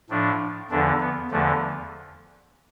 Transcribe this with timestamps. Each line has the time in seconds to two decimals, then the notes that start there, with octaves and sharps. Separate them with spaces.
0.10 A2 F3 D4
0.70 E2 D3 F3 D4
1.01 B3
1.31 E2 D3 F3 A3